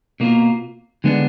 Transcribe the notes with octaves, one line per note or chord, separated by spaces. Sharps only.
B2 A#3 F4 A#4
D3 G#3 B3 D4